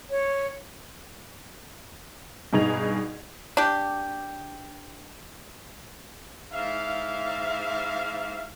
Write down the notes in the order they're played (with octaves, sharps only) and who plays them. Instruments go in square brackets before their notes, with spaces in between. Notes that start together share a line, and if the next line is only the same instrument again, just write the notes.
[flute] C#5
[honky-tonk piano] G2 B2 D#4 G#4 G#6 F7
[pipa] D4 G4
[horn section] G#2 E4 E5 F5